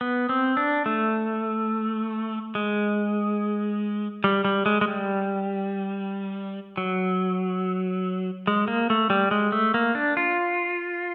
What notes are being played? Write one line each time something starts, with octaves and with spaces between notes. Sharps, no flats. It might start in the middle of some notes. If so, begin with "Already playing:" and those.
B3
C4
D4
A3
G#3
G3
G3
G#3
G#3
G3
F#3
G#3
A#3
A3
G3
G#3
A3
A#3
D4
F4